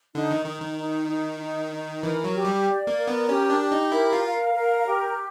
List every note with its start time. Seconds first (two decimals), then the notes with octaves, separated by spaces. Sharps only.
0.15 D3 D#4
0.31 D#3
0.46 D#3 D#4
0.62 D#3
0.78 D#4
1.09 D#4
1.40 D#4
1.72 D#4
2.03 E3 A#4
2.24 F#3
2.35 G4
2.45 G3
2.66 D5
2.87 A#3
2.98 A#4
3.08 B3
3.29 C#4 G4
3.50 D4
3.60 G4
3.72 D#4
3.92 E4 A#4
4.13 F4
4.24 F5
4.54 A#4
4.86 G4